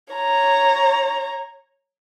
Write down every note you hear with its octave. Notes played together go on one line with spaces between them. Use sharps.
C#5 A#5